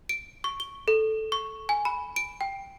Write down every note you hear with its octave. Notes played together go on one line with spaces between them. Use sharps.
D7
C#6
G7
A4
C#6
G#5
B5
D7
G5